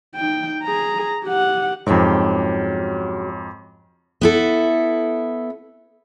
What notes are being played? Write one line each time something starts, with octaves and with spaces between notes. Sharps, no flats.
D#4 G5
G#4 A#5
G4 F#5
F2 G#2 C#3 F#3 G4
B3 E4 A4